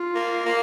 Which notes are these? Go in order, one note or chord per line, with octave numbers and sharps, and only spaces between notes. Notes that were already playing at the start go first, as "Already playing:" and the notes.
Already playing: F4
A#3
A#3